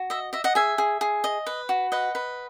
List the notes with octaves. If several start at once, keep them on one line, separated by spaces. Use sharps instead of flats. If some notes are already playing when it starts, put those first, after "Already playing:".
Already playing: F#4
D#5 E5
D#5 E5
D#5 F#5
G#4 E5 G#5
G#4
G#4
D#5
B4
F#4
B4 D#5 F#5
B4